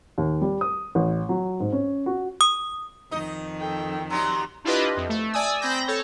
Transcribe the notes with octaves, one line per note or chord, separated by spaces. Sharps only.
D#2
G3
D#6
A1
F#3
G#2
C#4
F#4
D#6
F2 D#3 D#4 D#5
A4 G5
F#3 G3 D#4 A#5 C6
D4 E4 F4 G4 B4 D#5
F2
A3
D5 G#5 D#6 E6
C4 B5 G6 A#6
A4 C#5